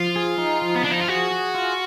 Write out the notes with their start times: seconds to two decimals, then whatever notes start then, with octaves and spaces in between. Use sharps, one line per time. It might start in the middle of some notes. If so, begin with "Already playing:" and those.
Already playing: F3 F4
0.16 G#4
0.38 D#4
0.62 F3
0.75 B3
0.84 F3 D4
0.91 D#4
1.00 F4
1.08 F#4 G#4
1.31 G#4
1.55 F4